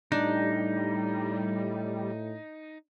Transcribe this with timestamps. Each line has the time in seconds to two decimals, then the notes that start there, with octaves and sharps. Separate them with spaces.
0.12 A2 G3 D4 D#4